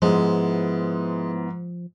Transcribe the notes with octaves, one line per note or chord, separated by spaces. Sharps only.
G#2 F3 G#3 B3 E4